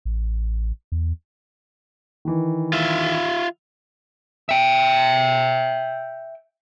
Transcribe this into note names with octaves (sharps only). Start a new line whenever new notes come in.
A1
E2
D#3 E3
F4 E5
E5 G5